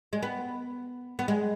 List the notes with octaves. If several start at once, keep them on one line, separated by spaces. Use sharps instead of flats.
G#3
B3
B3
G#3